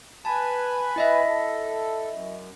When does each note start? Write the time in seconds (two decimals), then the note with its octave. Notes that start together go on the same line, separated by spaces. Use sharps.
0.25 B4 G#5 A5 B5
0.96 E4 D#5 E5
1.27 A4
2.12 F#2